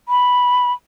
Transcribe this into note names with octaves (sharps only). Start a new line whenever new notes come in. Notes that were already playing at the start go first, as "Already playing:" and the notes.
B5